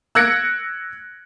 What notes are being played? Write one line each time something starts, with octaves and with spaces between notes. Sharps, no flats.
E6 F#6 G#6 A#6 C#7 D7